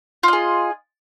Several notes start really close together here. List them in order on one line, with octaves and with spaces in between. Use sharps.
F4 D#5 G#4